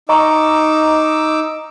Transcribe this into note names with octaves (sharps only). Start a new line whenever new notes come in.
D#4 D#5 A#5 C#6 D6 E6